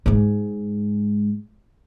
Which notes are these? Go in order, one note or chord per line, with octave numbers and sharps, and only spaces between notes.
G#2 G#3